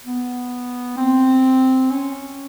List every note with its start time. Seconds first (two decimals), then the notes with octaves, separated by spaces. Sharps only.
0.04 B3
0.97 C4
1.91 C#4